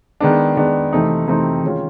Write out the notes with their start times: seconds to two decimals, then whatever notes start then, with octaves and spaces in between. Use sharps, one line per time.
0.21 D#3 G#3 B3 D4
0.57 D#3 G#3 B3 D4
0.93 C3 E3 A3 C4 D#4
1.28 C3 E3 A3 C4 D#4
1.63 D#3 G#3 C#4 F4